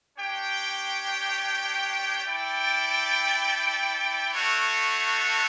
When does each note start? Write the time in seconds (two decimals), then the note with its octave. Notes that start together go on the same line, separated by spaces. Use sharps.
0.16 D4 G4 C#5 G5
2.24 E4 A4 D5 G5
4.32 A3 D4 F#4 A4 C#5